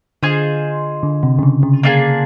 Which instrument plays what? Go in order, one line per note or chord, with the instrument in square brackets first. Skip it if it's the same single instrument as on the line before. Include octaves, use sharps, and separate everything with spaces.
[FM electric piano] D3 [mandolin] F4 G#4 C5 D#5
[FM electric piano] D3
C3
C#3
D3
C#3
[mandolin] A#3 D4 F4 G#4